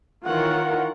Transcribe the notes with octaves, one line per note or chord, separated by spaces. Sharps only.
D#3 E3 F4 A#4 C#5 F#5